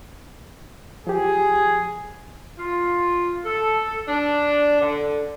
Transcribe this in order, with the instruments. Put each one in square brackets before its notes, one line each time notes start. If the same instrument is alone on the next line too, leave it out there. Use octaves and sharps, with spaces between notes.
[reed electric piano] F3 G4 [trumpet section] G#4
[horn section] F4
A4
D4
D3